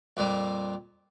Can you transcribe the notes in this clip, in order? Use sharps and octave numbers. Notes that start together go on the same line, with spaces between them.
F2 A#2 G3